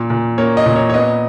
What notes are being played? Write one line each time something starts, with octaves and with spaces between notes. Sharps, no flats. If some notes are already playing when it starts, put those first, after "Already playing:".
Already playing: A#2
A#2
A#3 C#5
D#5
A#2
C#5
C#5
B3 D#5